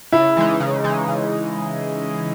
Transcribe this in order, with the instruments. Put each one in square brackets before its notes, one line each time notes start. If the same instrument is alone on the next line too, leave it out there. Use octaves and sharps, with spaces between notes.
[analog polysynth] C#3 [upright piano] E4
[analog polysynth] E3 G#3 D#4
C#3
E3 G#3 D#4
C#3